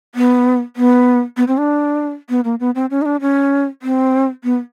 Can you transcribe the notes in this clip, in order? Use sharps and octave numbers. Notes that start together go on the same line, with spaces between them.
B3
B3
B3
C4
D4
B3
A#3
B3
C4
C#4
D#4
D4
C#4
C4
B3